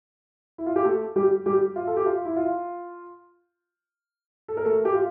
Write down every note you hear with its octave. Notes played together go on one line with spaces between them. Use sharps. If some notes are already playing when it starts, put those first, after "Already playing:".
E4
F4
G4
A3 A4
G3 G4
G3 G4
F4
A4
G4
F4
E4
F4
A4
A#4
A3 A4
G4
F4